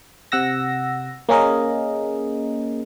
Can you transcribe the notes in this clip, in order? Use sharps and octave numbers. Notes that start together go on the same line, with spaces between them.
C3 F#5 E6 A#6
A#3 C#4 G#4 A#4 D#5